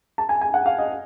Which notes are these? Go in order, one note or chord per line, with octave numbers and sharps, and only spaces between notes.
A5
G#5
G#5
F#5
F5
D#5